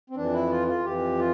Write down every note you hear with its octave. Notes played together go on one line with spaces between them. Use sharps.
C4
F2 E3 D4
E4
F4
F4
F2 E3 G4
F4